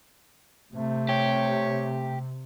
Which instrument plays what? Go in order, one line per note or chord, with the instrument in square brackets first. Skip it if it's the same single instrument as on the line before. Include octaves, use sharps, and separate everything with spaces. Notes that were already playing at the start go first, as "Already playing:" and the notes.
[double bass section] C3 [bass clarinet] A3
[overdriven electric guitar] G4 [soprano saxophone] C#5